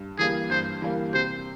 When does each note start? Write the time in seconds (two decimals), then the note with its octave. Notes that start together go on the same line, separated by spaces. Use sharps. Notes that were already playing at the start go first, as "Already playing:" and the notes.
Already playing: G2
0.18 E3 G3 A#3 G#4
0.50 G2 C5
0.82 E3 G3 A#3
1.13 C3 C5